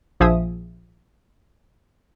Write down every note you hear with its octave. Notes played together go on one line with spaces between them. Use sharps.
A#1 F3 G#4 E5 D#6